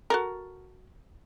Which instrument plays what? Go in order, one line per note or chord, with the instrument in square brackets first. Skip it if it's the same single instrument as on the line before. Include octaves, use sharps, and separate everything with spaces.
[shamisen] F#4 A4 A#4